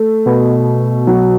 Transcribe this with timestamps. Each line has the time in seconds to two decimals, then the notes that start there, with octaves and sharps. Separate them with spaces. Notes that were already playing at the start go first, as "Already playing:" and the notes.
Already playing: A3
0.26 B2
1.07 F#3